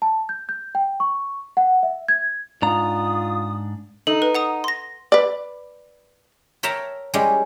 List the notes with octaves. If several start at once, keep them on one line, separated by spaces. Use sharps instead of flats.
A5
G6
G6
G5
C#6
F#5
E5
G#6
G#2 D4 F4 A#5 D#6
D#4 A4
B4
F#5 A#5 D#6
C6 A#6
B4 D5
A#4 C#5 E5 G5 A5 A#5
G3 G#3 C#4 E4 G4